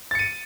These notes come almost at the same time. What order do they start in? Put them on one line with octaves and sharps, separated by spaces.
A6 C#7 D#7